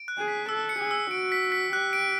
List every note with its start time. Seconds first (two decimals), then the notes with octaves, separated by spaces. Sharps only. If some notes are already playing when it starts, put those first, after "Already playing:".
Already playing: D7
0.08 F#6
0.18 G#4
0.28 B6
0.49 A4 E6
0.69 C#7
0.80 G#4
0.91 E6
1.11 F#4 D7
1.32 B6
1.52 B6
1.73 G4 F#6
1.93 D7